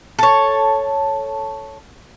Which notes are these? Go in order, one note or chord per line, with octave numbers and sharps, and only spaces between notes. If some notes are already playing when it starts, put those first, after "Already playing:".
A4 C#5